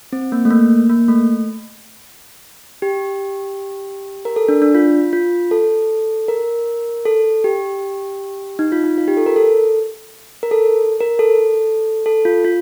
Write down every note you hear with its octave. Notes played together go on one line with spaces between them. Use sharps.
C4
A#3
A3
A#3
A#3
A3
G4
A#4
A4
D4
D4
F4
F4
A4
A#4
A4
G4
D#4
F4
D#4
F4
G4
A4
A#4
A4
A#4
A4
A#4
A4
A4
F4
F4